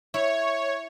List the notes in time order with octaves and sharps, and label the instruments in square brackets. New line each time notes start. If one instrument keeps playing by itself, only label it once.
[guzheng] E4 [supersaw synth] C#5